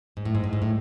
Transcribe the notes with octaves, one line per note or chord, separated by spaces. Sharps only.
G#2
A2
G#2
A2
G#2
A2